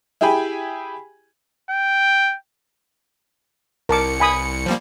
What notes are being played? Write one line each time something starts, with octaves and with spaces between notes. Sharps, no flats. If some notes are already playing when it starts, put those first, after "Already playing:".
E4 G4 G#4 G5 G#5 B5
G5
C2 A#4 A5 D6 C#7
G#5 B5 D#6
F3 G3 A#3